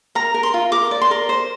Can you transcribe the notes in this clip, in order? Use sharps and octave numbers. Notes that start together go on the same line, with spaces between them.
A#4 A#5
A#4
C6
F4
A#4 D6
D5
C6
A#4
C5